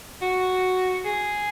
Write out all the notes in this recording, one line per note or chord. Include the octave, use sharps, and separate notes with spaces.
F#4
G#4